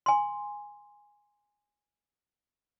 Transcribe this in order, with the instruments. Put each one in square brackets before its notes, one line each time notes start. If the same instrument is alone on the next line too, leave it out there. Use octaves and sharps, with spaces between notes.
[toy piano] G#5 C6